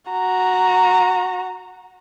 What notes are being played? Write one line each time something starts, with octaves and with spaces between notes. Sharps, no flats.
F#4 A#5